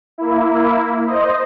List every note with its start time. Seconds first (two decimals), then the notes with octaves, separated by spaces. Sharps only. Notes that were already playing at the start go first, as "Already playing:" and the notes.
0.18 A#3 E4
1.06 C5 D#5